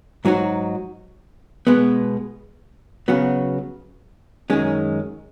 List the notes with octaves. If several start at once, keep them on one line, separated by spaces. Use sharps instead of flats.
G#2 F#3 D#4 F#4
B2 G#3 B3
C#3 F#3 B3 F#4
F#2 D#3 G#3 C#4